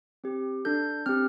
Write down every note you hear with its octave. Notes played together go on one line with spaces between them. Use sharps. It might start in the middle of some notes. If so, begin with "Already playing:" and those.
C4 G4
D4 A4 G6
C4 G4 F6